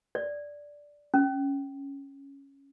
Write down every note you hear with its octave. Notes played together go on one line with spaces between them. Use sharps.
D5
C#4